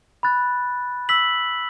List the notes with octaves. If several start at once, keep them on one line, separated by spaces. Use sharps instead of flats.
B5 F#6 A6
E6 B6 F#7